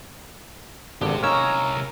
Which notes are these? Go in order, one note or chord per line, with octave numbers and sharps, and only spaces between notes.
G#1 D3 B3 C4 G4
C2 A#3 C#4 D#4 A#4 C#5 A#5 E6